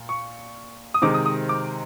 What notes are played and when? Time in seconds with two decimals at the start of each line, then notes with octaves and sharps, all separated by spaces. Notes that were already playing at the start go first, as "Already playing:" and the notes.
Already playing: A#2
0.09 C#6
0.94 D#6
1.02 C3 D#3 G#3 C4 D6
1.14 D#6
1.26 D#6
1.49 D6